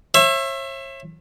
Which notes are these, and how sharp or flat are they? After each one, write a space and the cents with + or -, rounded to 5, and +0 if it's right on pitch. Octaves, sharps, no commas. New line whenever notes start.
C#5 -40 E5 +20